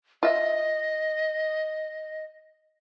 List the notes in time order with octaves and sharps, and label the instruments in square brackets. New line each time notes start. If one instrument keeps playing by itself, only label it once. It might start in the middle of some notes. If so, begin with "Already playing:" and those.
[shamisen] F4 E5 [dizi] D#5